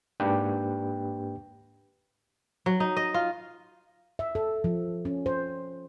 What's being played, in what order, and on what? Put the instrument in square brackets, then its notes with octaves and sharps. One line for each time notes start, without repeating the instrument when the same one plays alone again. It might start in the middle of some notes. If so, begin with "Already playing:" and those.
[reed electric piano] G#2 A#3 D4 G4 B4 G5
[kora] F#3
D#4
D#5
F4
[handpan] E5
A4
F3
C#4
C5